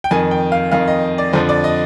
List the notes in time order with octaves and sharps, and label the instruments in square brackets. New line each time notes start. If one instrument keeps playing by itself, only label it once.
[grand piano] G5
F2 D#3 G#5
G5
F5
F2 D#3 F5
D#5
D5
F2 D3 F3 C5
D5
D#5